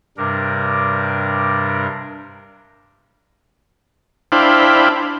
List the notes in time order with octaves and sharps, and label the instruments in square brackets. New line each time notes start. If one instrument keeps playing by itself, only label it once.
[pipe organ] G2 C3 G3 D4 A#4
[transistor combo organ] D4 E4 C5 F5 G5 B5